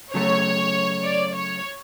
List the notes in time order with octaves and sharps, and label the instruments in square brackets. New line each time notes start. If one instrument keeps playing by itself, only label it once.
[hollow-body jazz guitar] C#3 F#3 A3 [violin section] C#5
[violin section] D5
C#5